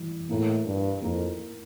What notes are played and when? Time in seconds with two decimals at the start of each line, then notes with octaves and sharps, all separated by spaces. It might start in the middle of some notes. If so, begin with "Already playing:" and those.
Already playing: E3 G3
0.29 A2 A#3 E4 A#4
0.66 G2
1.02 F2 A#3 E4 A#4